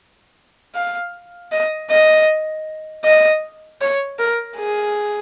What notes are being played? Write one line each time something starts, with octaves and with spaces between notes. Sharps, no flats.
F5
D#5
D#5
D#5
C#5
A#4
G#4